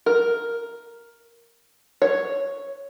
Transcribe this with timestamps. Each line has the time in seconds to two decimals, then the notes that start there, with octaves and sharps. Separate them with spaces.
0.06 A#4
2.02 C#5